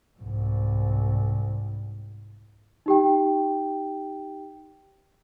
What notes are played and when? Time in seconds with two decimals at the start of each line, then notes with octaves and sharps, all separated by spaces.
0.19 C2 G#2
2.86 D#4 G4 G5